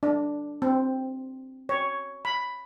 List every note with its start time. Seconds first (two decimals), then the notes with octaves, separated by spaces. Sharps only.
0.03 D4
0.62 C4
1.69 C#5
2.25 B5